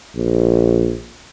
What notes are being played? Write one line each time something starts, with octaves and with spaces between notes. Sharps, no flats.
A#1